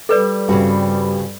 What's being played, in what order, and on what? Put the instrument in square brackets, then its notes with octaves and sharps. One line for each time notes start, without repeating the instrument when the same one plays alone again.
[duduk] G3 [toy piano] A4 B4 D5
[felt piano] G2 [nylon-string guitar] C#3 C4 F#4